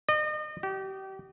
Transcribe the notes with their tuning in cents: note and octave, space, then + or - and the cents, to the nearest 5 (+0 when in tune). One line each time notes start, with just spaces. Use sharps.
D#5 -35
G4 -30